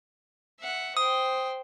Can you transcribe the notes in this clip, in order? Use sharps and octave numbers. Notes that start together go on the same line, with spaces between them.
E5 F#5
C5 G5 D#6